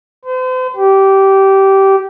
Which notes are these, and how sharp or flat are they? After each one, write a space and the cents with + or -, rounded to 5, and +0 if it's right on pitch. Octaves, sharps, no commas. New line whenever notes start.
C5 -40
G4 -15